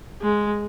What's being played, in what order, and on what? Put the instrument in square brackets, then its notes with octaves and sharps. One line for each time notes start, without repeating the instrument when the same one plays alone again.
[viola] G#3